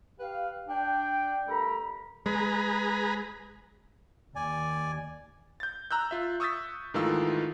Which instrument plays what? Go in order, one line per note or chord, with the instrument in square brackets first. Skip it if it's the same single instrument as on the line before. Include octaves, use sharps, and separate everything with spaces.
[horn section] G4 B4 F5
D4 G5
G2 A3 A#4 A#5 B5
[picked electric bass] G#3 [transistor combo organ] G#4 B4 A#5
[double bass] D#2 [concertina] D5 G#5
[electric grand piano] G6 A6
A#5 E6 F#6 G6
F4 E5
C#6 D#6 E6 G6 A6 B6
G#2 D#3 E3 A3 F4 E6